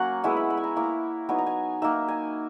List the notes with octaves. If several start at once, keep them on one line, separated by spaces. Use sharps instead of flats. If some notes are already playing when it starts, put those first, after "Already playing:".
Already playing: F#3 A#3 C#4 F#5
G#3 B3 E4 E5
B5
B5
G#5
A#5
A#3 E4 A#5
F#3 B3 D#4 G#5
A#5
G#5
A#3 D#4 E5
G#5